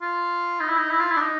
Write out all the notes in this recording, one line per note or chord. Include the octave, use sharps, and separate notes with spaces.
F4
D#4
E4
D#4
E4
F4
E4
D4
D#4